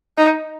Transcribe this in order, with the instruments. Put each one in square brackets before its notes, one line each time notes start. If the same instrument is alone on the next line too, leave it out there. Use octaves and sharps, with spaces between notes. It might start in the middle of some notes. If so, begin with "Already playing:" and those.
[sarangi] D#4